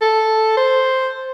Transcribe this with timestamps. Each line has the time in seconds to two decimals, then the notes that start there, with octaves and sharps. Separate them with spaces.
0.01 A4
0.57 C5